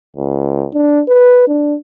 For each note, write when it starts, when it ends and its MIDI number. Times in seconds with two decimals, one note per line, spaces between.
0.16 0.66 37
0.74 1.02 62
1.08 1.43 71
1.48 1.76 62